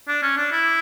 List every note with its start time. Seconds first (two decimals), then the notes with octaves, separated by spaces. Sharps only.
0.08 D4
0.22 C#4
0.37 D4
0.52 E4